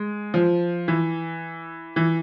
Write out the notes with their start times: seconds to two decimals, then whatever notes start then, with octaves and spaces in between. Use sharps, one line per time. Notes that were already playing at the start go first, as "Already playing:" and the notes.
Already playing: G#3
0.34 F3
0.88 E3
1.96 E3